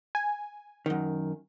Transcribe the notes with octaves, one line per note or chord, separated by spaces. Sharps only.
G#5
F#2 D#3